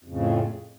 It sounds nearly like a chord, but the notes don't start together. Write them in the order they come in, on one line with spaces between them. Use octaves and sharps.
F2 C#3 A2